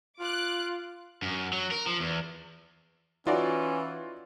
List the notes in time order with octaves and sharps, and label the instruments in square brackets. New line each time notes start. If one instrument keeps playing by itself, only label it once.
[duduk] F4 [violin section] D6 F#6
[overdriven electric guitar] F#2
F#3
A#4
F3
E2
[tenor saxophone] E3 [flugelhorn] C#4 [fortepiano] D#4 F#4 D5 [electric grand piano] F4